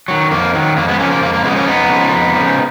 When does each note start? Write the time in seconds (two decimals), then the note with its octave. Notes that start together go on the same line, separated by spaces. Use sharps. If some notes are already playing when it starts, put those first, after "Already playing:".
0.08 D#3 F#3
0.31 F2 A#3
0.54 D#3 F#3
0.76 F2 A#3
0.88 G#3 B3
0.99 C#3 F3 A#3 C#4
1.11 A#3
1.21 F2 A#3
1.33 A#3
1.44 C#3 F3 G#3 B3
1.56 A#3 C#4
1.67 F2 B3 D#4
1.90 C#3 F3
2.12 F2
2.35 C#3 F3